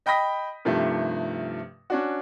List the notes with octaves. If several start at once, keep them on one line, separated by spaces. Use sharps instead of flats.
D#5 G5 B5 D#6 A#6 B6
G2 C3 D#3 F3 A3
C#4 D4 F#4